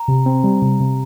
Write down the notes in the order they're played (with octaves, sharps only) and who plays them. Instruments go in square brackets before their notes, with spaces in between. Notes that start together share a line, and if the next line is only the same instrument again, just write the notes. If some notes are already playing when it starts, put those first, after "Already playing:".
Already playing: [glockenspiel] A#5
[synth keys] C3
C4
G3
C3
C3